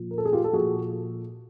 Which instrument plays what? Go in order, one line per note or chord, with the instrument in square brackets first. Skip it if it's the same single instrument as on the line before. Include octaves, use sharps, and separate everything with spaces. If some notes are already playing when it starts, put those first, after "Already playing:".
Already playing: [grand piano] A#2 F3
A#4
A4
G#4
F4 G4
A4
A#2 F3 F#4 G#4